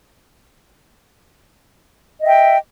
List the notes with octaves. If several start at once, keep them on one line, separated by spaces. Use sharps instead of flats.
D#5 E5 G5